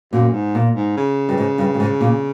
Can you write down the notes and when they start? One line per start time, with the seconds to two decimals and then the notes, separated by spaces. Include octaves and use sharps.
0.12 F#2 A#2
0.33 G#2
0.55 A#2
0.76 G#2
0.97 C#3
1.29 G2
1.38 G#2
1.58 G2
1.74 G2
1.80 G#2
2.01 A#2